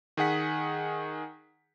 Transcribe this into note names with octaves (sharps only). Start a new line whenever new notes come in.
D#3 G#4 F#5 B6